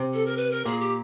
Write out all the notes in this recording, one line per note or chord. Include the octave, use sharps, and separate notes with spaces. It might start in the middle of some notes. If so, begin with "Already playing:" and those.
Already playing: C3
A4
A#4
B4
A#4
A#2 G#4
G4